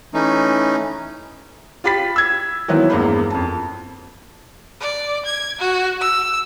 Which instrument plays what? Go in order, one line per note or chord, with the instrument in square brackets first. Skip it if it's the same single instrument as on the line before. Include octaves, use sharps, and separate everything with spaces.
[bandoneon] E3 A3 C#4 D#4
[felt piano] F4 G4 B5 A6 B6
E6 G#6
D#3 E3 F#3 B3 C4 E4
E2 G2 G#3 A#3 C5 B5
F2 A5
[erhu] D5
G#6
F#4
E6